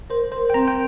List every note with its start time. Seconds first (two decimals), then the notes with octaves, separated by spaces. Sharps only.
0.10 A#4 C5
0.32 A#4 C5
0.50 G5
0.54 C4 A#5
0.68 G5